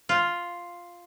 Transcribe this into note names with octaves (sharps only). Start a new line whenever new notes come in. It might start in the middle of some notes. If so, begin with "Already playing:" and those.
F4